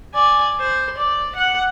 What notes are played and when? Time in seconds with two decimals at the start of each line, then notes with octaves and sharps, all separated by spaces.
0.14 D5 G#5
0.60 C5
0.98 D5
1.35 F#5